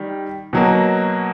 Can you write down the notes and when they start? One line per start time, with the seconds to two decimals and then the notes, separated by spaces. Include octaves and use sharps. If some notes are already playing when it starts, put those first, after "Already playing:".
Already playing: D#3 G3
0.53 B2 F#3 A#3